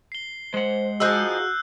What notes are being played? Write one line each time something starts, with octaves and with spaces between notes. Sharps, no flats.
C7 G7
G#3 C5 F#5
F3 D#4 F#4 G#4 E6 F#6 G6